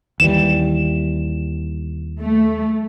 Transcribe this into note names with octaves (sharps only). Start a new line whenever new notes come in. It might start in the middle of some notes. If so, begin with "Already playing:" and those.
D#2 E3 G3 E7
A3